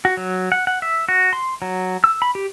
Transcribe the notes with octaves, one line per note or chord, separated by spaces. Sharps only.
F#4
F#3
F#5
F#5
E5
F#4
C6
F#3
E6
B5
G4